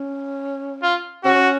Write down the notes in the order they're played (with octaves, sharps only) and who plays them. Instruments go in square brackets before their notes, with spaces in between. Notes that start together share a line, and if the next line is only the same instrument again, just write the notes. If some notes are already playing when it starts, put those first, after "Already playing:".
Already playing: [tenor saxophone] C#4
[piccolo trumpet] F4
[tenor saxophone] C#4 [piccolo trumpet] F#4